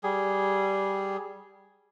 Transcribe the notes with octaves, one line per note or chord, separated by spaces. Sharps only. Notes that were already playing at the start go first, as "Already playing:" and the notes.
G3 G#4